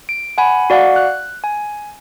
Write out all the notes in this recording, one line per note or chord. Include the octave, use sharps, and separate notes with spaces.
D7
F#5 G#5 B5
F#4 D5 F5 F#5
F#6
G#5